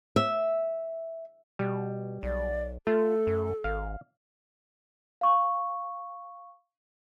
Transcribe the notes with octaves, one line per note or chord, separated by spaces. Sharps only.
E5
B2 G3
B1 D5
A3 F4 A4
F#2
G#1 F5
F5 C#6